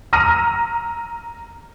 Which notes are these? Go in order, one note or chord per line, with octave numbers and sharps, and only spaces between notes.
A#5 E6 F6 A#6 D#7